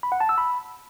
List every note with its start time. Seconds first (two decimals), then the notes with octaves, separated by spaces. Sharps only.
0.03 B5
0.12 F#5
0.20 A5
0.29 E6
0.38 B5